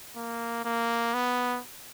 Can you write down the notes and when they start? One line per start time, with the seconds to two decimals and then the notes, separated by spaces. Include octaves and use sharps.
0.16 A#3
0.65 A#3
1.14 B3